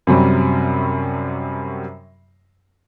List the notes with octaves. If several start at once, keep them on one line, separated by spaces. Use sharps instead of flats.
F#2 C3 F#3 G3